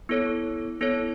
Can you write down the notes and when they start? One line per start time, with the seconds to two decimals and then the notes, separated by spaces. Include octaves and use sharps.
0.09 B3 E4 A4 C#5
0.81 B3 E4 A4 C#5